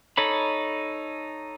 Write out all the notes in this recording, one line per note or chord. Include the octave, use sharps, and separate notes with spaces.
D#4 A4 C#5 B5